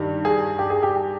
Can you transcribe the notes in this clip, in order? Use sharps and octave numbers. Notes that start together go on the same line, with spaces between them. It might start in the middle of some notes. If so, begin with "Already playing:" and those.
Already playing: G2 D#3
G#4
G4
G#4
G4